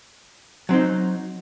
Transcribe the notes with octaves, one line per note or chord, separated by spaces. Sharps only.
F#3 C4 D#4